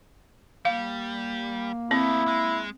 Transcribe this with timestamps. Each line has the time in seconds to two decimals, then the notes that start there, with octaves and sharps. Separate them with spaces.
0.65 G3 A#3 F5
1.91 A3 B3 C4 E4
2.27 G#3